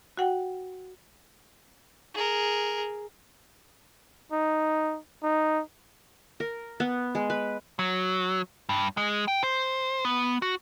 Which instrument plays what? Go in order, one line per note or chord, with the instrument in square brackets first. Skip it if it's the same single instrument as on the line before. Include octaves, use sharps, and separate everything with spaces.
[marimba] F#4 F#5 G5
[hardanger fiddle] G#4 A#4
[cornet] D#4
D#4
[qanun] A#4
B3
G#3
B4
[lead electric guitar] F#3
G2
G#3
G5
C5
B3
F#4